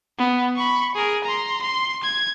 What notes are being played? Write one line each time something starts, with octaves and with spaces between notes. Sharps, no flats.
B3
B5 C#6
G#4 A#4
A#5 C6
C6
G#6